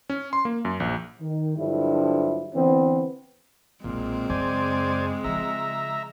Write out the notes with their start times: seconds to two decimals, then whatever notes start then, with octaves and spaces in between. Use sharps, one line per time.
0.10 C#4
0.33 C6
0.45 A#3
0.65 F#2
0.80 A#1
1.20 D#3
1.58 G2 D3 F3 F#3 E4
2.54 D3 E3 B3 C4
3.84 B1 A#2 F#3 G#3 C4
4.30 F#2 C#3 C5 D5 G#5
5.24 C#3 F3 E5 A#5